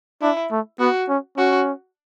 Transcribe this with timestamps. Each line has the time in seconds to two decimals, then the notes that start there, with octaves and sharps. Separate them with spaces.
0.22 D4 E4
0.51 A3
0.80 B3 F#4
1.09 C#4
1.37 C#4 F#4